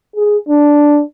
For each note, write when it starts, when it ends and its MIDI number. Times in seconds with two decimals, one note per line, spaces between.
0.16 0.37 68
0.49 1.02 62